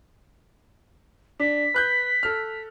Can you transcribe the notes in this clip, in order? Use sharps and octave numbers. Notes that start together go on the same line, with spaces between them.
D4 B6
B4 F#6 G6
A4 F6